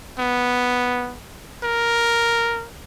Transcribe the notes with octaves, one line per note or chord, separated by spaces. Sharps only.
B3
A#4